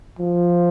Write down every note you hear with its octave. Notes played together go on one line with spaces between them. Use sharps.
F3